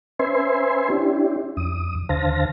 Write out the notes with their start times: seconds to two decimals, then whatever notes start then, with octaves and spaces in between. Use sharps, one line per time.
0.19 C#4 B4 C5 E5 G#5 C6
0.90 C#4 D4 E4 G4
1.57 F2 D#6
2.09 D#2 D3 C5 F5 A5 A#6